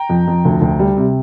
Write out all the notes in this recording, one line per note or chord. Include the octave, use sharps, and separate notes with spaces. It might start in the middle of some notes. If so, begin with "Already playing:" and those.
Already playing: G5 A#5
F2
F2
D2
D2
G3
C3